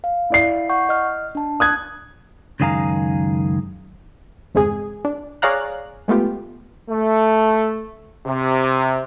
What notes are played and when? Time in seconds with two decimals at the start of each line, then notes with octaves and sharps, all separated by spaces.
0.04 F5
0.30 E4 D5 C7
0.69 F#5 C#6 G6
0.89 D#5 F6
1.35 D4 A5
1.60 D#6 F#6 G#6
2.60 C#2 F#2 D#3 G#4 F5 A#5
4.55 G1 E2 C3 G#3 G#4
5.05 D4
5.42 G#4 C#5 D5 F5 A#5 F#6
6.08 G#3 A3 B3 F4 G4
6.90 A3
8.25 C3